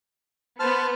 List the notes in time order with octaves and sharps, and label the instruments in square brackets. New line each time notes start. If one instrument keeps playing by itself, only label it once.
[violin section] B3 [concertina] C5 A5 F6